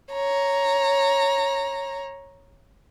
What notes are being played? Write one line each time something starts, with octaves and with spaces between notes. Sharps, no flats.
C#5 A#5